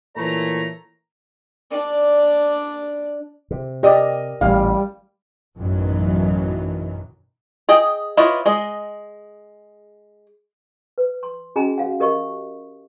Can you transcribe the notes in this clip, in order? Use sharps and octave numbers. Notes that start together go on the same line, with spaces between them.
A#2 E3 A3 C#5 A#5
D4 D5
C3
G4 A#4 D5 D#5
A1 A#2 G3 F5
A1 F#2 B2 D#3 E3 F#3
G#4 D#5 G5
E4 F4 B4 C#5 D#5
G#3 D#5
B4
C6
C#4 F#4 G#4 D#5 G#5 A#5
F#4 F5 F#5
G4 A#4 D#5 F5 C#6